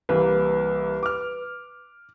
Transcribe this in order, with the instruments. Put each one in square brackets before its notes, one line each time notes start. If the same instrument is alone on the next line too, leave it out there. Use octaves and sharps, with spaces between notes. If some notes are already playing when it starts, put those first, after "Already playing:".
[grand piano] C2 E3 A#3 [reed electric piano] B4
[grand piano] D6 F6